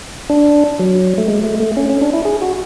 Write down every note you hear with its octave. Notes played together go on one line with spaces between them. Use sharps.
D4
F#3
A3
G#3
A3
A3
C#4
C#4
D4
E4
G#4
F#4